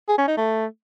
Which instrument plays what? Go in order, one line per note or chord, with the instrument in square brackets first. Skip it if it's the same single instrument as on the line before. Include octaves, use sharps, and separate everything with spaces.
[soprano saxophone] G#4
C#4
D#4
A3